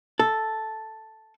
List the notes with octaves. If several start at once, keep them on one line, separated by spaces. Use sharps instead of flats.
A4